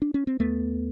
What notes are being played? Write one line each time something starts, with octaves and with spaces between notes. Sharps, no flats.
D4
C#4
C4
D#2 A3 B3